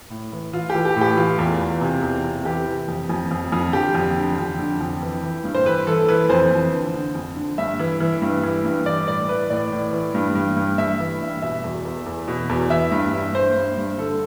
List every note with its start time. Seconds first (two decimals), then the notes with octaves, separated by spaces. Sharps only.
0.10 A2
0.32 E3
0.53 E3 F4
0.70 G4
0.75 E3
0.85 G4
0.96 A2 G4
1.17 E3 F4
1.38 E2
1.60 E2
1.81 C3
2.02 E2
2.24 C3
2.45 E3 G4
2.67 E3
2.88 F2
3.09 F2
3.31 F2
3.52 F2
3.73 D3 G4
3.95 F2
4.16 D3
4.38 F2
4.59 D3
4.81 F2
5.02 E3
5.23 E3
5.44 G2
5.55 C5
5.66 E3 B4
5.87 E3 A4
6.08 E3 B4
6.29 F2 C5
6.51 F2
6.73 D3
6.94 D3
7.15 F2
7.36 D3
7.58 G2 E5
7.79 E3
8.00 E3
8.22 G2
8.43 E3
8.64 G2
8.86 E3 D5
9.07 A2 D5
9.29 E3 B4
9.50 A2 D5
9.72 A2
9.93 E3
10.14 G2
10.35 G2
10.57 G2
10.78 G2 E5
11.00 E3
11.21 G2
11.42 B2 E5
11.64 E2
11.85 E2
12.06 E2
12.28 B2
12.49 E2
12.70 E3 E5
12.92 G2
13.13 G2
13.35 G2 C5
13.56 G2
13.78 G2
13.98 D3 A4